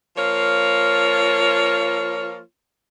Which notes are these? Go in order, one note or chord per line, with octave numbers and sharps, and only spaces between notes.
F3 A#3 F4 C#5